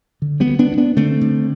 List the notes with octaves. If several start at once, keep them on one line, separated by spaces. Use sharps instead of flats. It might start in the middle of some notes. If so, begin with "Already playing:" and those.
D3
G3 B3
D2
B3 D4
D2
B3 D4
D3 A3 C4
D3